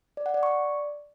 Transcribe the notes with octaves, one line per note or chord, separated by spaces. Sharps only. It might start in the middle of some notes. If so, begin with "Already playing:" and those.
D5
F#5
D5
C#6
D5